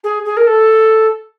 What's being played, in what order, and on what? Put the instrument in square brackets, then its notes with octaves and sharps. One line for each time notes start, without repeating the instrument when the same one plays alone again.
[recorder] G#4
G#4
A#4
A4